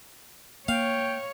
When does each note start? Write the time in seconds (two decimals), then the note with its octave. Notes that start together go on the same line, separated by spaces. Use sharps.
0.68 A#3 C#5 F5 G5